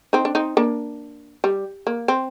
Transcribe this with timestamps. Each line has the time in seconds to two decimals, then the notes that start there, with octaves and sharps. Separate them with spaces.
0.13 C4 D#4
0.25 D4
0.35 C4 D#4
0.57 A#3 D4
1.44 G3
1.87 A#3
2.08 C4